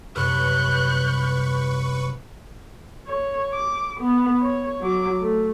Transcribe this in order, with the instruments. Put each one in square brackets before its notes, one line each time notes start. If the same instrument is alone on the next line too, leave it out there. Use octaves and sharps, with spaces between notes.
[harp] C2 F#2 C3 [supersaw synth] B4 C#6 [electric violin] F#6 G6
[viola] C#5
D6
B3
C#5
F#3 D6
A3